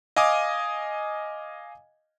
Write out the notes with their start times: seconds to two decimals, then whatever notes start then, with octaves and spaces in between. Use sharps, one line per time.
0.16 D#5 F5 G#5 D6 D#6